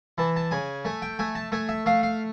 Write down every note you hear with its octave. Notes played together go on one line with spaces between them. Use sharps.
E3 A5
A5
C#3 G#5
A3 G#5
G5
A3 G#5
A5
A3 G#5
E5
A3 F5
F5